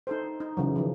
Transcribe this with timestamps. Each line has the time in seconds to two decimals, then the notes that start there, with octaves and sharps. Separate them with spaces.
0.07 D#4 A4 C5
0.40 D#4
0.57 C#3 E3 F#3
0.76 D#3 F3